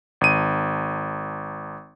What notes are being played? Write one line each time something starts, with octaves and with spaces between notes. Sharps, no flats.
G#1 D#7